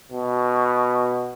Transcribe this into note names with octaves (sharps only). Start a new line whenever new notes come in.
B2